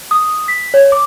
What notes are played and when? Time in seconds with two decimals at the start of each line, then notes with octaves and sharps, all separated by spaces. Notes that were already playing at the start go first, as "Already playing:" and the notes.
0.11 D#6
0.48 B6
0.74 C#5
0.92 D6